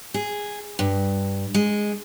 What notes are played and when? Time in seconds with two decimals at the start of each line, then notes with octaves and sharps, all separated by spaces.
0.14 G#4
0.79 G2
1.54 G#3